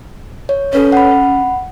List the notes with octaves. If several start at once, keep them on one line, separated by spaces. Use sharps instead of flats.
C#5
C#4 A4 B4 C#5
F#5 B5